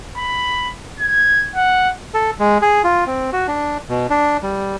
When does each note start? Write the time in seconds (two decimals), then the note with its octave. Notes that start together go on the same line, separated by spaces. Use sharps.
0.18 B5
1.00 G#6
1.56 F#5
2.14 A4
2.40 G#3
2.62 G#4
2.84 F4
3.07 C4
3.33 F#4
3.48 D4
3.89 B2
4.10 D4
4.43 G3